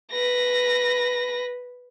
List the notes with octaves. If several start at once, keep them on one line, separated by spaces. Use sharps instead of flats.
B4 A#6